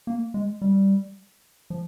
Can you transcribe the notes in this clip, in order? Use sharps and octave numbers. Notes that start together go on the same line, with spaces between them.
A#3
G#3
G3
F3